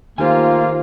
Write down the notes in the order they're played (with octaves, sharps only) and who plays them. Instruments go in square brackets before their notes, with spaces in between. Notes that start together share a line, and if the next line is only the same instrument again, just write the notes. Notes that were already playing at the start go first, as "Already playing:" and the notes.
[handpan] D#3 G4 C5 [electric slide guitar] A3 D#4 G#5 [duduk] A#3 [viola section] F4